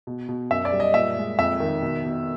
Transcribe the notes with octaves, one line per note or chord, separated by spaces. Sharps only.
B2
B2
F#2 E5
D5
G3
D#5
A#2 E5
G#3
F2 E5
D#3
B2
B2